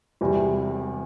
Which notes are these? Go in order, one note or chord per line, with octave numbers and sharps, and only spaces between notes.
E1 E2 C3 G3